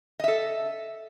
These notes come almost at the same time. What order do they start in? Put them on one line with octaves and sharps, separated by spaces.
D#5 E5 A4